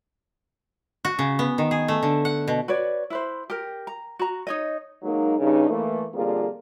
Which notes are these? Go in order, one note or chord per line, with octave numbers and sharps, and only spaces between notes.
F#4
C#3
B3
D#3
G#4
A3
D3
F#5
B2
F#4 B4 C#5 D5
E4 B4 C5
G4 A#4
A#5
F#4 A#5
D#4 C#5 D#5
F#3 G#3 A#3 D#4
G2 C#3 D#4
E3 A3 A#3
F2 D3 G3 A#3 F4 G#4